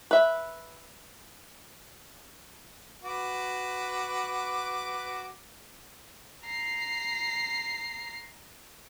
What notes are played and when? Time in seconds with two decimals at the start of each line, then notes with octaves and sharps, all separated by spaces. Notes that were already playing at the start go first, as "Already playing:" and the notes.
0.11 B4 E5
3.03 F#4 B4 D6
6.45 A#5 C7